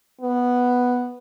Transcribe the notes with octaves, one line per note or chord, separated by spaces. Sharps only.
B3